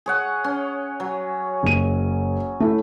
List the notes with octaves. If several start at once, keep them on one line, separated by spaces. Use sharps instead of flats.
G#4 C#5 F#5
C#4
F#3
F#1 D#7
A3 E4